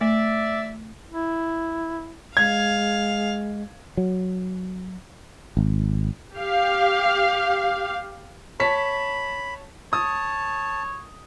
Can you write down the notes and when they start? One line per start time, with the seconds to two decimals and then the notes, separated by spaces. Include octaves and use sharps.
0.01 A3 D5 E5
1.12 E4
2.37 G#3 F5 G#6
3.97 F#3
5.57 G#1
6.35 G4 F5
8.60 C#5 A5 B5 B6
9.93 C#5 A5 D#6